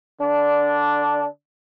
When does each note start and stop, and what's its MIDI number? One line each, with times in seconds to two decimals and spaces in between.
0.21 1.26 50
0.21 1.26 62